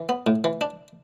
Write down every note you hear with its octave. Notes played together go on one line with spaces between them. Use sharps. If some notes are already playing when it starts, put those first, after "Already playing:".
Already playing: E3
B3
A2
E3
D4